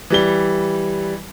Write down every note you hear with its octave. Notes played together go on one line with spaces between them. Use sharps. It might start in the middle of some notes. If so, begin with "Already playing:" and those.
E3 G3 G7